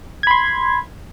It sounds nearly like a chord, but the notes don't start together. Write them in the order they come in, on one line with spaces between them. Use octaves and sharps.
G#6 B5 C6